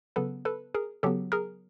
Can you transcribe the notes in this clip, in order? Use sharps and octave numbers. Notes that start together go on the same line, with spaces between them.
C#3 F#3 B3 A4 B4
A4 B4
G#4 A#4
C#3 F#3 B3 G4 A4
G#4 A#4